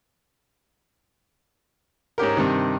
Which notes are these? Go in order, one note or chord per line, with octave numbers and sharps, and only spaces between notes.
G#2 C#4 G4 A#4
G2 C3 D#3